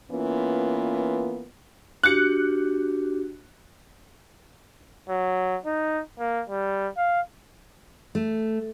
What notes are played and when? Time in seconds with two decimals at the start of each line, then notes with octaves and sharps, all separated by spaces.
0.12 E3 A#3 B3 C#4 F4
2.03 D4 F#4 G4 F#6 C#7
5.10 F#3
5.65 D#4
6.19 A#3
6.49 G3
6.97 F5
8.15 A3